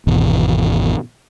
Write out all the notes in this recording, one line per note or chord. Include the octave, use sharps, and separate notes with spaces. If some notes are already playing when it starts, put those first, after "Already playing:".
G#1 E2 B2